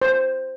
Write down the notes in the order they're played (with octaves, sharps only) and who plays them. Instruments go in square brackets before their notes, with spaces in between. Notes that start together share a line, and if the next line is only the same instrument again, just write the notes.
[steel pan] C5